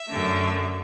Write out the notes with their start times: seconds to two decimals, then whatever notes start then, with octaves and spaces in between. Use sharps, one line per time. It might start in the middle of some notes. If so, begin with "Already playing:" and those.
Already playing: E5
0.09 F#2 D3 A3